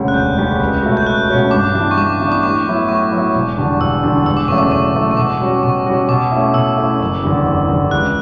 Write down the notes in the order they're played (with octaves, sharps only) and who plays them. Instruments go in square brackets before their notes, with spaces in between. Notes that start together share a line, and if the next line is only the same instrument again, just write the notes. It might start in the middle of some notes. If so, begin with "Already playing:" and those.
Already playing: [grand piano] E1 D2 C#3 G3 C#4
[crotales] F#6
[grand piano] E1 [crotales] G6
[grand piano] D2 C#3 G3 C#4
C#2
B2 A3 C#4 F#4
[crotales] G6
[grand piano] C#2 [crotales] F#6
[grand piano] B2 A3 C#4 F#4
[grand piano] G2 [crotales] D6
[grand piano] E3 G3 B3 D4
[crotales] C#6
[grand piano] G2 [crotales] D6
[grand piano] E3 G3 B3 D4
[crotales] D6
[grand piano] A2 [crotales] C#6
[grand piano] F#3 B3 E4
[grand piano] A2 [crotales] C#6
[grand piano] F#3 B3 E4
E1
E2 D3 G3 D4
[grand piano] E1 [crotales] E6
[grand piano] E2 D3 G3 D4
[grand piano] E1 [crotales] E6
[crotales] D6
[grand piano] E2 C#3 F#3 A3 [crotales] C#6
[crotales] D6
[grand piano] E1 [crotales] C#6
[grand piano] E2 C#3 F#3 A3
[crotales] C#6
[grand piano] B2 [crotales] D6
[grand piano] G3 C#4 F#4
[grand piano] B2 [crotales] C#6
[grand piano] G3 C#4 F#4
[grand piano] B2 [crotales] D6
[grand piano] A3 C#4 E4
[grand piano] B2 [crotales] E6
[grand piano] A3 C#4 E4
F#1
E2 D3 G3
F#1
E2 D3 G3
[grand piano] C#2 [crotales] F#6